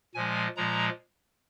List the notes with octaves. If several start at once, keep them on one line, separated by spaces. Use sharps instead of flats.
A#2 F3 G#3 G#5
A#2 F3 G#3 A#5